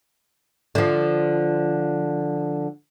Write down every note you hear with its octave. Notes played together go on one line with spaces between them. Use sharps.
D3 F3